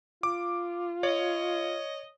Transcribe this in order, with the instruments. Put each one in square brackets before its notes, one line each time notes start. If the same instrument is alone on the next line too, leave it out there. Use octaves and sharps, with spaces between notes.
[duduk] F4 [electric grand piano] D6
[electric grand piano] C#5 [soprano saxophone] D#5